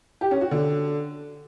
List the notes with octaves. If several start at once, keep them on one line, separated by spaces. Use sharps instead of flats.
G4
C#4
F#4
D3